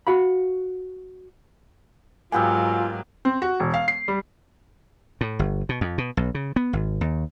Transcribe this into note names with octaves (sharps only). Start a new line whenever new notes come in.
F#4 F5 B5
G#2 F#3 A#3 B3 F4 G4 G#5 E6
C4
F#4
E1
F5
C7
G3
A2
G1
B2
F2
B2
B1
C#3
B3
G#1
D#2